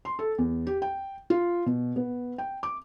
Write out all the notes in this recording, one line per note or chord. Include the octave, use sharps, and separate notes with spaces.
C6
A4
E2
G4
G5
F4
B2
B3
G5
D6